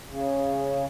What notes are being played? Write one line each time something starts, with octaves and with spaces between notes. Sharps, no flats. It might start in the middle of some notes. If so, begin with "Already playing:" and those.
C#3